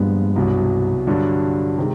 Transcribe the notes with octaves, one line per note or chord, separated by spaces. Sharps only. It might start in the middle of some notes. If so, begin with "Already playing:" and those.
Already playing: G2 A#2 F3 G#3 B3
C2 B2 F#3
G2 D3 F#3
C3 D#3 G#3